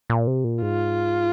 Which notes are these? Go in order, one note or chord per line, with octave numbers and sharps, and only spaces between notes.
A#2
C3
A#2
G#2 F4